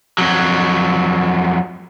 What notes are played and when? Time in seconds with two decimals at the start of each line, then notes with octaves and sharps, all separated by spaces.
0.18 F2 F#3